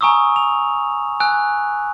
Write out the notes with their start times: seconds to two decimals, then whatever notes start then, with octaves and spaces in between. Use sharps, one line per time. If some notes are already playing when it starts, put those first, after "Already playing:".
0.01 G#5 A#5 C#6 D#6 E6
0.36 F7
1.20 G#5 E6 F#6